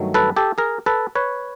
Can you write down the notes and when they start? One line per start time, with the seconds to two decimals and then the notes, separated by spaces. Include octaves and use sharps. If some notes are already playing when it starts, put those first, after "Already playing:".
Already playing: G2 D#3 F#3 A3
0.14 A4 B4
0.36 G4 A4
0.58 G#4 A#4
0.86 A4 B4
1.15 B4 C#5